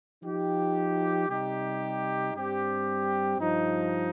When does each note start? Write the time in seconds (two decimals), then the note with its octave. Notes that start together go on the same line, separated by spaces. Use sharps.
0.23 F3 D#4 G4
1.28 C3 G3 D#4 G4
2.33 G2 G3 C4 G4
3.38 G2 F3 D#4